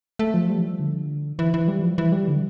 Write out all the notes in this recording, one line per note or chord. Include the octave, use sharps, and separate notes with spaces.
A3
F3
G3
E3
F3
D3
E3
E3
G3
F3
E3
G3
D3